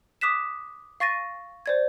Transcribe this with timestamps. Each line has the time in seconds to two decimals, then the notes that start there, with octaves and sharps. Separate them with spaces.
0.21 D6 D#6 F#6 B6 E7
1.00 F5 C#6 A6 A#6 D#7
1.66 C5 D5 G#6